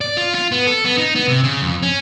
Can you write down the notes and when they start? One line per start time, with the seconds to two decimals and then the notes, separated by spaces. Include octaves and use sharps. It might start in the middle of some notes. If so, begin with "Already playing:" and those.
0.01 D5
0.17 F4
0.35 F4
0.52 B3
0.67 A4
0.84 B3
0.98 D#4
1.15 B3
1.28 C3
1.43 C#3
1.62 F2
1.83 C#4